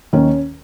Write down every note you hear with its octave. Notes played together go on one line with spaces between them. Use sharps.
D#2 D#3 C#4